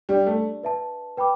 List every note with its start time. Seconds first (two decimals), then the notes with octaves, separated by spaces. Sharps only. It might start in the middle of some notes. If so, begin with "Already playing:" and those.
0.09 G3 D4 G4 D5
0.27 A3
0.63 B4 E5 A5
1.17 B4 G5 B5 D6